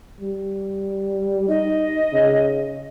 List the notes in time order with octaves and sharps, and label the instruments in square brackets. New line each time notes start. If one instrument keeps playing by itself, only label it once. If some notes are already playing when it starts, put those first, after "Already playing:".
[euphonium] G3
[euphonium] D#4 [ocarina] D#5
[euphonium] C#3